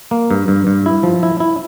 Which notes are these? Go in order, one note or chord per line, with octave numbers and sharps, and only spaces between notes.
A#3
G2
G2
G2
E4
F3
E4
E4